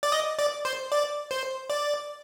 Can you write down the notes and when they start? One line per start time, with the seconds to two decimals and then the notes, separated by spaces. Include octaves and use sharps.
0.03 D5
0.12 D#5
0.39 D5
0.65 C5
0.92 D5
1.31 C5
1.70 D5